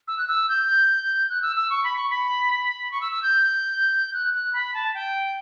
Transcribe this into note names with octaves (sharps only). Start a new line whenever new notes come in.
E6
F#6
E6
G6
F#6
E6
E6
C#6
B5
C#6
B5
C#6
E6
E6
G6
F#6
F#6
B5
A5
G5